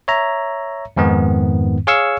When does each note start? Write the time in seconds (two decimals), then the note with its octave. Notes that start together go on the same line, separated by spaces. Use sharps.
0.08 C#5 E5 A#5
0.97 F2 G#2 D#3 B3
1.87 G#4 C#5 F5 C#6 E6